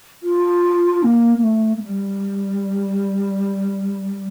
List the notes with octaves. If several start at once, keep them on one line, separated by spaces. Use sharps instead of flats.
F4
A#3
A#3
A3
A3
G3